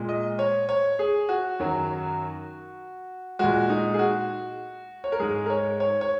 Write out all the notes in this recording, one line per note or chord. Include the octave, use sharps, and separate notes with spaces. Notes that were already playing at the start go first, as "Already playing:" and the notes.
Already playing: A#2 G#3
D#5
C#5
C#5
G#4
F#4
F#2 D#3 F#3
A#2 G#3 F#4
D#4
G#4
F#4
C#5
A#4
G#2 G#3 G#4
A#4
C#5
C#5
C#5